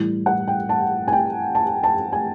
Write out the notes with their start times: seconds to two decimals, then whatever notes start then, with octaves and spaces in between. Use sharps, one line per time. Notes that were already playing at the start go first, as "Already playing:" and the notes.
Already playing: A2 E3 G3
0.26 F#5
0.47 G5
0.69 A5
1.08 G#5
1.13 G5
1.55 A5
1.83 A5
2.13 G#5